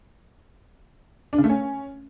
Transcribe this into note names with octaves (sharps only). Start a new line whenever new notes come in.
D4
C#3
A3
C#4